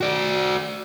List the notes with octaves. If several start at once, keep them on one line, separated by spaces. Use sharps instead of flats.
F#4 D5